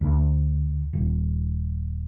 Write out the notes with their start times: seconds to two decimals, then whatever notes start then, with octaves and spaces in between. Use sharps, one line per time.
0.01 D2
0.93 D#1